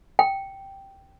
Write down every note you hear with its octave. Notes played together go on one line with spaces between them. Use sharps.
G5